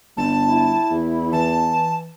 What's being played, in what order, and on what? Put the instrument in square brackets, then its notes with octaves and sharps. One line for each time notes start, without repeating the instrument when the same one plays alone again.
[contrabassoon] G1 [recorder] A5
[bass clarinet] E4
[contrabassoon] E2
[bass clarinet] E3 [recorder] A5